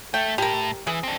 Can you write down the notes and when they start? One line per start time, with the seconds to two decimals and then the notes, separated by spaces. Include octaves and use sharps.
0.14 A3 G5
0.38 A2 G4 A#4
0.87 E3 G#4
1.03 C4 D4